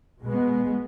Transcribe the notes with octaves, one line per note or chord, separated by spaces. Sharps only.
B2 G#3 B3